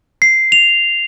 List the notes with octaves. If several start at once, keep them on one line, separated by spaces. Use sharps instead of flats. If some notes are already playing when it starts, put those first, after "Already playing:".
C7
F7